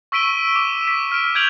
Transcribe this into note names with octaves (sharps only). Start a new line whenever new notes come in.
C#6 E6 B6 D7 D#7 G7
D6
B6
F6 D7
F6 G6 G#6 D7 F7 F#7